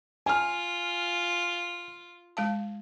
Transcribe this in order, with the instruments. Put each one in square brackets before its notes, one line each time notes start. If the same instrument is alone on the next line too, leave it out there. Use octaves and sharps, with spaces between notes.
[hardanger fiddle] F4 [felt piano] G#5 F6
[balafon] G#3 F5 A5